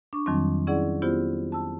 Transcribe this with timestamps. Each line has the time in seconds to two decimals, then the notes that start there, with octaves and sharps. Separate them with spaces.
0.13 D4 C#6
0.26 F2 D#3 F#3 G3 C4
0.67 C#4 E4 G#4 D5 F#5
1.02 B3 E4 F4 G4 C5
1.52 A5 E6